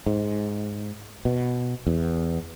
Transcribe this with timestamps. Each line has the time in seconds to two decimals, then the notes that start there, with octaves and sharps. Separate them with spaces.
0.06 G#2
1.25 B2
1.87 E2